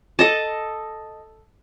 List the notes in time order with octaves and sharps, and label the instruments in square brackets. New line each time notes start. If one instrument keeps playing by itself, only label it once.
[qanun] A4 D#5 A5